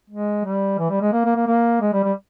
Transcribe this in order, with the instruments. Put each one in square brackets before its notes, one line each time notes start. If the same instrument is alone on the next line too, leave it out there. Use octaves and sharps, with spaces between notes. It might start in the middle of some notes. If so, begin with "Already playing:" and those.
[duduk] G#3
G3
E3
G3
G#3
A#3
A#3
A#3
A#3
G#3
G3
G3